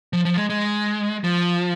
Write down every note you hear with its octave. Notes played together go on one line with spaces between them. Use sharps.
F3
F3
G#3
G#3
F3